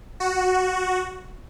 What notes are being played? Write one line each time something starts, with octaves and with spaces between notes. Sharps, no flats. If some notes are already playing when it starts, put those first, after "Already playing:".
F#4